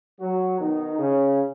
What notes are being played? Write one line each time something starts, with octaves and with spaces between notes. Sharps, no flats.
F#3 F#4
B2 D#3 D#4
C#3 C#4